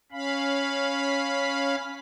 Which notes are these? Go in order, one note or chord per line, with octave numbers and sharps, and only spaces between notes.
C#4 F5 B5